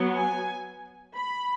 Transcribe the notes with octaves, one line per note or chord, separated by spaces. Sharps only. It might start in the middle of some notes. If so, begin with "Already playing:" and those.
Already playing: F#3 B3
G#5
B5